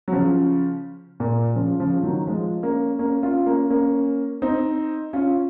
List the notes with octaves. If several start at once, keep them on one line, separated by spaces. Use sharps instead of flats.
F#3
C#3 F3
A#2
C#3 F3
C#3 F3
D#3 F#3
F3 G#3
A#3 C#4
A#3 C#4
C#4 F4
A#3 C#4
A#3 C#4
C4 D#4
C#4 F4